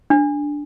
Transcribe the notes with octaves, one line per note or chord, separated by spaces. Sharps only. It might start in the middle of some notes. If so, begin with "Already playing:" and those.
D4